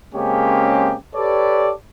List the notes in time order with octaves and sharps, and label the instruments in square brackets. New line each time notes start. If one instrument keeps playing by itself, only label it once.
[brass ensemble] C#3 G#3 A#3 C4 C#4 G4
G4 A4 B4 C#5 D5